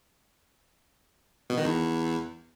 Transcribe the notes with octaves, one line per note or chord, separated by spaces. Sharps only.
B2
D#3
E2